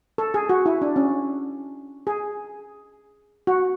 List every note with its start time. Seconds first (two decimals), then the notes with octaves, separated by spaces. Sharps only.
0.18 A4
0.34 G#4
0.49 F#4
0.66 E4
0.82 D4
0.96 C#4
2.07 G#4
3.47 F#4